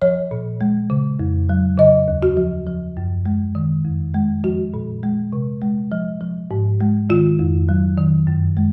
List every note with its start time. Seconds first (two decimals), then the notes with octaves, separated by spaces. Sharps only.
0.02 F3 C#5
0.31 A#2
0.61 G#3
0.90 C#3
1.20 F2
1.49 F#3
1.78 C#3 D#5
2.08 D#2
2.23 F#4
2.37 F3
2.67 F3
2.97 F#2
3.26 G#3
3.55 D#3
3.85 F2
4.15 G#3
4.44 F3 F#4
4.74 A#2
5.03 G#3
5.33 C3
5.62 G#3
5.92 F3
6.21 F3
6.51 G#2
6.81 G#3
7.10 D#3 F4
7.39 F2
7.69 F#3
7.98 D#3
8.27 F#2
8.57 G#3